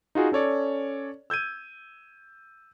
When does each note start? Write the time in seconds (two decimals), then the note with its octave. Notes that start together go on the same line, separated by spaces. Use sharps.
0.15 D#4 F4 F#4 G#4
0.32 C#4 A4 C#5 D5
1.30 E6 G6 G#6 D#7